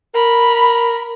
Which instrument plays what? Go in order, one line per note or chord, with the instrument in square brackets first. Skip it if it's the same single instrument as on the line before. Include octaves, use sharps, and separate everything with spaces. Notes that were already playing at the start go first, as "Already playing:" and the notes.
[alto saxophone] A#4 [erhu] B5